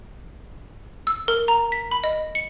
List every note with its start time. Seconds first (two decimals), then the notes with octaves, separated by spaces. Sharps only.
1.07 E6
1.28 A#4
1.48 A#5
1.72 B6
1.91 B5
2.04 D#5
2.35 C#7